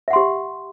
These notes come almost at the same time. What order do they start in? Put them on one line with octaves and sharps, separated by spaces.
E5 F#5 C6 G4